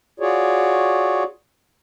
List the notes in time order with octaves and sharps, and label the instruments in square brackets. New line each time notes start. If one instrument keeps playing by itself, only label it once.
[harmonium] F4 F#4 G#4 C#5 D5